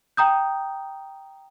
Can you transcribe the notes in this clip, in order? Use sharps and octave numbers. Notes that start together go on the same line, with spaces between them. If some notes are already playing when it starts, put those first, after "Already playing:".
G5 A#5 D#6 G6